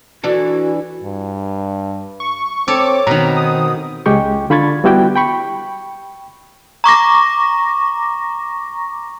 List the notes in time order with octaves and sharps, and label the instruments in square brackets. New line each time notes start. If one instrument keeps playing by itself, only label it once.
[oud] E3 D4 A4 [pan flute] F#4
[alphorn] G2
[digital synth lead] C#6
[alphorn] C4 [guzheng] A4 C#5 [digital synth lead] D6
[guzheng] B2 D#3 [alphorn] C4 [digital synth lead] A#5
[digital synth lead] D#6
[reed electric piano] C#2 G#3 G4 G5 C#6
D3 F4 B5 C#6 G#6 A6
G3 B3 E4 F#4 G4 G5
G5 B5 C#6
[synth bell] A#5 C#6 D6 A#6